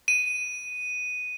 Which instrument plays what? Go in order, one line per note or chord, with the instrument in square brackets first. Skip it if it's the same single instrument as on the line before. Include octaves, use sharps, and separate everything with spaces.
[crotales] D#7